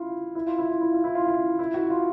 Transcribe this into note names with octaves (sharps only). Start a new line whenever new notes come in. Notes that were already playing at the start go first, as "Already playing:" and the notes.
Already playing: E4 F4
E4
F4
E4
F4
E4
F4
E4
F4
E4
E4
F#4
F4